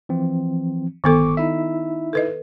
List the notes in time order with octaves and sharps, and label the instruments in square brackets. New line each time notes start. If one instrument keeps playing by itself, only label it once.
[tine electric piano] E3 F3 C4
[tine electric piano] G1 C#6 D6 [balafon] D#3 B3 A4
[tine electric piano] D#4 E4 E5
[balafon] A4 B4 D#5